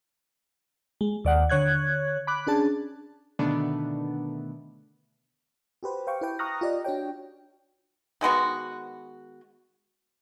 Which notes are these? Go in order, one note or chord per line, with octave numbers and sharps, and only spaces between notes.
G#3
D#2 D5 F#5
D3 C#5 F#6 G#6
B5 D6 F#6
C#4 D4 G#4 A5
B2 D3 D#3 A3 B3 D4
F#4 G4 B4 C5
C5 F5 G5 C#6 D6
E4 B4 G5
A#5 C#6 D#6 F6 F#6 A#6
F4 G4 D5 D#5
D4 F#4 C#5 G5
D#3 G#3 B3 F#4